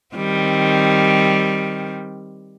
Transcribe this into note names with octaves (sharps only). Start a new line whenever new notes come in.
D#3 G3 C4